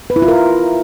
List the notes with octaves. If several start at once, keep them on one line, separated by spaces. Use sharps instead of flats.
B4
E4
F4
A#4